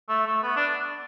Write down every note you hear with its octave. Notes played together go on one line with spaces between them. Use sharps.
A3
A3
B3
D4